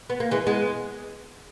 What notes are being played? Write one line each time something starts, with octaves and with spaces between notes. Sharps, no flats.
B3
A#3
E3 G#3
G#3 B3